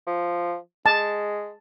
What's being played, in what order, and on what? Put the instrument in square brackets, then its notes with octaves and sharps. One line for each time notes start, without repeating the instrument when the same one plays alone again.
[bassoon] F3
[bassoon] G#3 [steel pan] A5